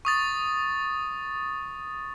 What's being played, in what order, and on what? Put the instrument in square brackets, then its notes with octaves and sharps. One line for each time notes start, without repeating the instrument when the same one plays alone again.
[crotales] C#6 D#6 A6